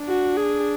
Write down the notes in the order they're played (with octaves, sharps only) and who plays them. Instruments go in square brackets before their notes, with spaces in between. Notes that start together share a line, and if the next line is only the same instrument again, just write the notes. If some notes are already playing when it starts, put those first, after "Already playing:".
Already playing: [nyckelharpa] D4
[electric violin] F#4
G#4